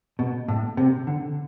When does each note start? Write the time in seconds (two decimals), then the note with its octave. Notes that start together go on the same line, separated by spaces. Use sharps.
0.19 B2
0.48 A2
0.77 C3
1.07 D3